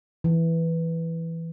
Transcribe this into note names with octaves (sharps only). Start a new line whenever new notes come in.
E3